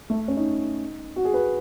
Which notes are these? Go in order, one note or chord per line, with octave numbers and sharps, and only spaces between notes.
A3
C#4
D#4
F#4
G#4
B4